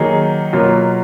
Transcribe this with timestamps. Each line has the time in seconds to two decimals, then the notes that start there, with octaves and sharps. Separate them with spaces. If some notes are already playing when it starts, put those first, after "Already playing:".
Already playing: D#3 F#3 A#3 D#4 G#4
0.53 B2 F#3 A#3 F4